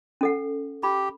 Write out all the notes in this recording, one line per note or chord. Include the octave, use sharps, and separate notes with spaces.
C#4 A4 F#5
G4 B5